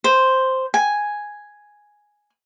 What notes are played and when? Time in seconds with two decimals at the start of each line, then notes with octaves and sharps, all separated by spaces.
0.04 C5
0.74 G#5